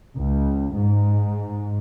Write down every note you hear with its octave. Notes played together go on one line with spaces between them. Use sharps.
C#2
G#2